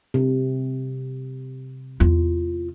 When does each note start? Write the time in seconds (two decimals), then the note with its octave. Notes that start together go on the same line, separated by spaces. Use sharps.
0.14 C3
2.00 E2 F4